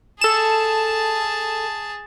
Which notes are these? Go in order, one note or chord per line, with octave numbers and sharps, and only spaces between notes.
G#4 A4 A5 E7